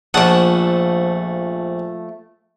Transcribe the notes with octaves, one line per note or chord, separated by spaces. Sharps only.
A#1 F3 A3 F#5 D#6